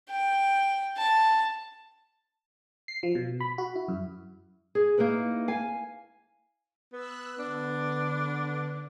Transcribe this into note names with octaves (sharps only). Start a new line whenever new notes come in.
G5
A5
C7
F3
B2
B5
F#4
E4
F#2
G#4
A#3 D#4 E4 B4
F5 G#5
B3 E6 F#6
D3 B3 D4